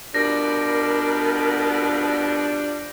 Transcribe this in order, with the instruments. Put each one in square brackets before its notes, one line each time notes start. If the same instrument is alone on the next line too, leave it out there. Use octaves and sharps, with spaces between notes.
[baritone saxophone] B2 [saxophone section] F3 G3 D4 [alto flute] A#4 [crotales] A#6